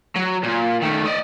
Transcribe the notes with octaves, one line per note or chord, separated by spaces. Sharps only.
F#3
A#2
D#3 A3
D5 D#5